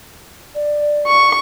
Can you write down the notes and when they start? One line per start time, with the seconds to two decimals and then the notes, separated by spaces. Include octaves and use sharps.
0.55 D5
1.07 C#6